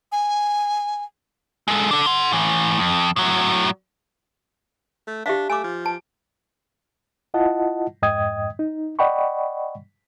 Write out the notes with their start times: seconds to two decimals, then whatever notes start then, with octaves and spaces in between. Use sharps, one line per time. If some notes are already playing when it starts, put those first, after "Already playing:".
0.12 G#5
1.68 G#3 A4
1.91 D4 A4
2.06 F#5 C6
2.32 A2 E3
2.79 F2
3.16 A2 F#3
5.07 A3
5.26 D4 G4 E5 F5
5.50 A3 G#5 D6
5.64 F3
5.86 A5
7.34 E4 F4 D#5 F#5 A5
8.02 F2 G#2 D#5 G5 D#6 G#6
8.59 D#4
8.99 D5 D#5 F#5 G5 B5 C#6